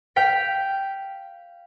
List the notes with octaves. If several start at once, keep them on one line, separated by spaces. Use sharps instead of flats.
F5 G5 B6